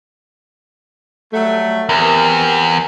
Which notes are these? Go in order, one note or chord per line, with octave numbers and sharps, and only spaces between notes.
F#3 G3 A3
E2 C4 G4 A#4